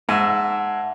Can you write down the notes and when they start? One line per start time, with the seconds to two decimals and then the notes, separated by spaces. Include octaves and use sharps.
0.09 G#2 D#5 E5 F#5 A5